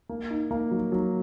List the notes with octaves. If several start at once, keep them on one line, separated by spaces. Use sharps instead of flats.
A#3
D#4
A#3
F#3
F#3